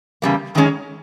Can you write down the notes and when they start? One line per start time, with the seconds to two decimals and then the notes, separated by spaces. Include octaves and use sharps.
0.22 E2 C#3 G3 A#3
0.55 F#2 D#3 G#3 C#4